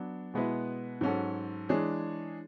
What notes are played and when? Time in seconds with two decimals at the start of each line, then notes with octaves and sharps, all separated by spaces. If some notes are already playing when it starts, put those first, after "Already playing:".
Already playing: F#3 B3 D4
0.34 B2 G#3 B3 E4 B4
1.01 G#2 F#3 C#4 F#4 A4
1.69 E3 G#3 D4 G#4 C#5